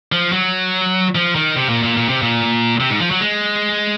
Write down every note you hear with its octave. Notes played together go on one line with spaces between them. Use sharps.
F3
F#3
F3
D#3
C3
A#2
A#2
A#2
C3
A#2
C3
G#2
F3
F#3
G#3